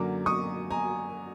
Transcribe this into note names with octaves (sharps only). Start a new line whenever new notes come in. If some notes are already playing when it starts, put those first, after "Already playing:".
Already playing: F#2 D3 F#3 A#3 D6
C#6 D#6
G#5 A#5